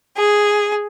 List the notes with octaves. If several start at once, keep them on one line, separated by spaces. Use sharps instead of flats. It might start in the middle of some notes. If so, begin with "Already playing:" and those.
G#4